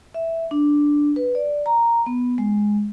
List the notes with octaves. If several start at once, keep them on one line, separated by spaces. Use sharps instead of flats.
E5
D4
B4
D5
A#5
B3
G#3